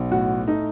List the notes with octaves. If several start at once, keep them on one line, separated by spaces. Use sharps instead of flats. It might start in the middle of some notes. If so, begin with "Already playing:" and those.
Already playing: B1
A2 F#4
A3 D#4